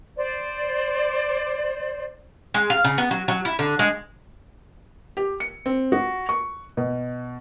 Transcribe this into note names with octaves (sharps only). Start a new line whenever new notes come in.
C5 D5
G#3
F5
C#3
B3
F#3
F#3
E4
D3
G#3
G4
C#7
C4
F#4
C#6
B2